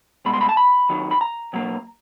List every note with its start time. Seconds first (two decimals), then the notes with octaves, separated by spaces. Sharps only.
0.25 C2 B2 G#3 B5
0.33 C6
0.41 B5
0.49 A5
0.57 B5
0.89 D#2 D#3 F#3
1.11 B5
1.21 A#5
1.53 B2 F#3 A#3